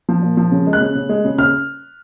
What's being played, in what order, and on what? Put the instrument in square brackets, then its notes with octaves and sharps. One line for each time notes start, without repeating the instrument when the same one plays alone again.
[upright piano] F3
A#2
F3
C#3
G#3
F#6
C#3
C#3
G#3
C#3
C#3 F6